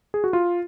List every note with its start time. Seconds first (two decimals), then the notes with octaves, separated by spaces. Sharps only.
0.14 G#4
0.24 F#4
0.33 F4